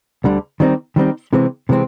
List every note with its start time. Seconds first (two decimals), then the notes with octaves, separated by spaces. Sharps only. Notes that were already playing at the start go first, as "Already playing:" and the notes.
0.24 D2 D3 G3
0.60 D#3 G3 C4 D#4
0.96 D#3 G3 C4 D#4
1.33 C3 E3 G#3 C4
1.69 C3 E3 G#3 C4